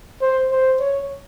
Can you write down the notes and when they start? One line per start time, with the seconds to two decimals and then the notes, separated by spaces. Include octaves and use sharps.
0.22 C5
0.51 C5
0.80 C#5